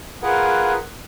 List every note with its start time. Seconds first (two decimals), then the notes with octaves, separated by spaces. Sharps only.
0.22 F4 G#4 A#4 B4 F#5